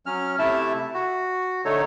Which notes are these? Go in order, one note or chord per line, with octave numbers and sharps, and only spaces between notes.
F#3 C#4 F6
C3 A3 E4 E5 A5
F#4
D3 A3 D#4 A4 C#5